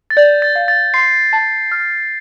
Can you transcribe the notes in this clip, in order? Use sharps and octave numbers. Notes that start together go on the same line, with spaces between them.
A6
D5 G6
A6
F5
A6
C6 C7
A5
F6